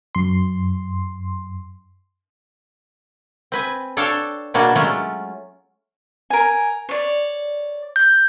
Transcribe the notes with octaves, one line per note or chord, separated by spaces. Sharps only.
F#2 C6
C4 B4 G#5
D4 A4 C#5 F5 G5 A5
B2 G3 A#3 D4 F#4 G#4
F#3 G#3 A3 C#4 F4
A#4 G#5
C#5 D5
G6